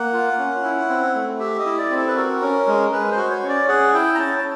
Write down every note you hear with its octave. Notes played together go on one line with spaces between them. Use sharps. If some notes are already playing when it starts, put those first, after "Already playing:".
Already playing: A#3 F#5
F4
C#4
E4
C4
A3
G4 E5
D#5
E4
D5
C4
A4
B4
F#4 A#4
C#4
G#3
G#3 B4
C5
F#4
C#5
C#4
D5
G#4 F#5
E4 G5
A#5
C#4 A5
A5